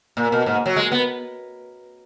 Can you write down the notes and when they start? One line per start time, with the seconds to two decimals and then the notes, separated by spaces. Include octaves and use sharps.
0.17 A#2
0.32 B2
0.46 G#2
0.66 F#3
0.76 G#3
0.92 B3